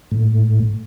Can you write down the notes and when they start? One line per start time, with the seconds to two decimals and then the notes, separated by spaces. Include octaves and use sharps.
0.11 A2